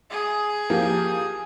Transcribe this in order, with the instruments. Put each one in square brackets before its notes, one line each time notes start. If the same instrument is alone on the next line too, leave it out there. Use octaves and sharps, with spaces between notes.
[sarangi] G#4
[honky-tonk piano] F3 A#3 G4